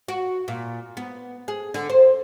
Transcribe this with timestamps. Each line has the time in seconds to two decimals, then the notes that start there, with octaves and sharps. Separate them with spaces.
0.08 F#4
0.48 A#2
0.97 B3
1.48 G#4
1.74 D3
1.90 C5